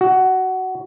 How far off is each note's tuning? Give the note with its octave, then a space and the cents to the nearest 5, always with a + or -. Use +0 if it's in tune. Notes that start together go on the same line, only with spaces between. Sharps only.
F#4 +15